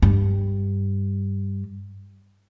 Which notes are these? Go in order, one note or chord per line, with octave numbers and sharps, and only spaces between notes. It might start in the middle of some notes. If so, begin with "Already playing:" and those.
G2